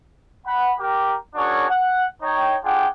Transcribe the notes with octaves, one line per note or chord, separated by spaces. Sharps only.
F#5 B5
G4 A#4
C#4 D4 F#4 G#4 A#4 C#5
F#5
D#4 C#5 G5
D4 F4 G#4 F#5 G5